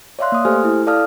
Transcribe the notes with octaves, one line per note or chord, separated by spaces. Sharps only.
C#5 D5 E5 F5 C6 F#6
A#3 D#6
A3 G4 A4 C5 G#5 F6
E4
A4 D5 F5 A5 D#6 F6